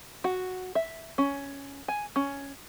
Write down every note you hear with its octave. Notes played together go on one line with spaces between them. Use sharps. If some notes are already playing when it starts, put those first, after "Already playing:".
F#4
E5
C#4
G#5
C#4